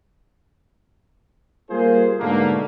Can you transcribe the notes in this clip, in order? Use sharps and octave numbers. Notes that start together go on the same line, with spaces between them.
G3 A#3 F4 G#4 C5
G#2 B2 D3 A3 A#3